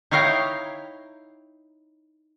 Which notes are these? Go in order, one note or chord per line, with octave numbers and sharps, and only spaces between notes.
D#4 E4 C#5 F5 G5 A#5